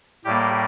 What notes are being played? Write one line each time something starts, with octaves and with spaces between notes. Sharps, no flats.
A2 G3 A#3 G4